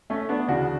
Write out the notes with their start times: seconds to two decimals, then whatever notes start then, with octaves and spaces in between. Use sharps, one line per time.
0.10 A3 C#4
0.29 B3 D4
0.48 D2 C#3 E3 D4 F#4